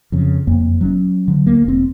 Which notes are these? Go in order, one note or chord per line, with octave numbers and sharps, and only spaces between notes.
F2 C#3
F#1 F2 A#3
F#3 C4 C#4
D3 F#3
D2 A#3
E1 C4